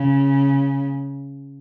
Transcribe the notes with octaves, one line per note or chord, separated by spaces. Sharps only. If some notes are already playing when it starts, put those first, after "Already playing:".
Already playing: C#3